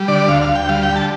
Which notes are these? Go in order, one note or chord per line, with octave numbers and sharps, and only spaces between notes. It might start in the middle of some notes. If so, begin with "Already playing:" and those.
Already playing: G3
D3 D5
D2 F5
F5
D2
G5
G3 F5
G5
D3
A5